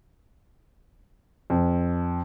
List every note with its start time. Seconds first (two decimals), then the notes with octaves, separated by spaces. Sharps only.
1.50 F2